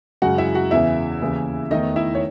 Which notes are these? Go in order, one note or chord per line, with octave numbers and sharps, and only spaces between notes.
F#2 C#3 G#3 F#4 F#5
E4 E5
F#4 F#5
E2 C#3 E3 E4 E5
D#2 C#3 E3
E2 D#3 A3 D#4 D#5
E4 E5
C#5